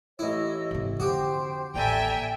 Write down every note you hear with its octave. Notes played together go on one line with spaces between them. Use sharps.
A1 E4 C#5 D#5 E6
G#2 C3
F2 D3 F#4 G4 C5 G5
D#1 A1 A4 D5 E5 G5 G#5 A#5